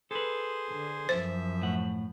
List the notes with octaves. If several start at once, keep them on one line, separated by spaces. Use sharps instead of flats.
G#4 A4 B4 C5
D3
F#2 F3 C5 E5
A2 F#5